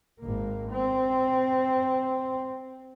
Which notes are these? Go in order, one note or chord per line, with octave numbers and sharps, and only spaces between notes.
G#1 A#3
C4